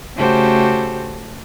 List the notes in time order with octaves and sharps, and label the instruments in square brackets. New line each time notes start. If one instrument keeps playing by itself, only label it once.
[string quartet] C#3 A3 F#4 G4 A4 C5